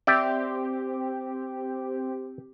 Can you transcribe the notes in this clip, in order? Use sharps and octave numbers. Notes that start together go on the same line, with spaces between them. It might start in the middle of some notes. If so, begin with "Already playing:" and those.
C4 G4 D5 E5 G5